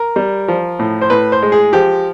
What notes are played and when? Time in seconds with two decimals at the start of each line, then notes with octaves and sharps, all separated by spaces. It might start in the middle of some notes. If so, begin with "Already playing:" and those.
Already playing: A#4
0.16 G3
0.48 F3
0.79 A2
1.02 C5
1.10 A2 B4
1.32 C5
1.43 G#3
1.52 G#4
1.73 F3 G4